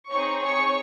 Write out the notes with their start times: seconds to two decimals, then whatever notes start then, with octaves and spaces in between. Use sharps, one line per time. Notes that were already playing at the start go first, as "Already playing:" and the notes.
0.09 C4 D#4 G#4 C#5 C#6
0.40 C#5 C#6